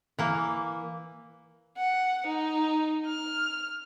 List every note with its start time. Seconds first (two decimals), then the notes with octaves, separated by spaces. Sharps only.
0.19 E3 A#3
1.77 F#5
2.27 D#4
3.07 F6